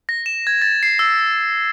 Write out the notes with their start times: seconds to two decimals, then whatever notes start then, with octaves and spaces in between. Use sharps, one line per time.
0.09 A#6
0.26 E7
0.47 G#6
0.62 A6
0.83 C7
0.99 E6